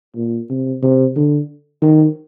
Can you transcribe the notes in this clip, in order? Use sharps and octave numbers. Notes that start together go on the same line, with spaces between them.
A#2
C3
C3
D3
D#3